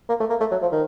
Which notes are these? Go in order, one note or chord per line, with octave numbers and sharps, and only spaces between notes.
A#3
A3
A#3
A3
F#3
F3
D#3